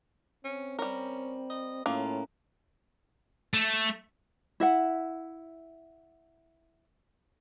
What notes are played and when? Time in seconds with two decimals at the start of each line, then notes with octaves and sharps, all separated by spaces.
0.45 C4 C#4
0.79 G3 C#4 A#4
1.50 D#5
1.86 A2 A#3 C#4 F4
3.54 A3
4.60 E4 E5 F#5